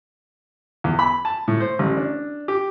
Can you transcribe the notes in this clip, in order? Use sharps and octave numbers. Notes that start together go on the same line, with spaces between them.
E2
B5
A5
A2
C5
A1
D4
G4